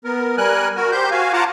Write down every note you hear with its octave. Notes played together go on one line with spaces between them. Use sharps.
B3 A#4
G3 A#4 G#5 F#6
F#4 A#4
G4 C5 G6
F#4 F5 G#5
F4 F#5 A5 A#5 D6